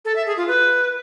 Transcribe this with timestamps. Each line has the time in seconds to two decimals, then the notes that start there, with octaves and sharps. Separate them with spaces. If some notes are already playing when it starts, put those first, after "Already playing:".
0.05 A4
0.16 E5
0.26 G#4
0.37 F4
0.48 B4